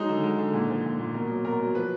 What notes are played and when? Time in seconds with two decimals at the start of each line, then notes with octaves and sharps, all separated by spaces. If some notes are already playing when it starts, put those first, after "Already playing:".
Already playing: F#3 G#3 D#4
0.09 D3
0.24 G#3
0.38 D3
0.53 A#2
0.69 F3
0.85 A#2
0.99 A#2
1.14 B2 A#4
1.29 F#3
1.45 B2 A#4
1.60 F#3
1.75 F3 B4